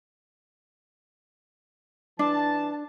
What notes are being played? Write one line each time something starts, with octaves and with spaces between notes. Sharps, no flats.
E3 D4 A5